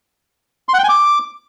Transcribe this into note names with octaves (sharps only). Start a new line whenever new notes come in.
C6
F#5
G5
G#5
D6